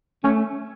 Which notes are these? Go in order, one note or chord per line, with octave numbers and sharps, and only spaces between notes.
A3 C#4